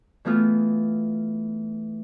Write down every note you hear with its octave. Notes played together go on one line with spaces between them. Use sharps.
E3 A3 B3 F4 G#4